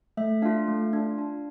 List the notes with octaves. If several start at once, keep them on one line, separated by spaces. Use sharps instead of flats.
A3 E5
D4 F4 F5
A3
D4 F4
D4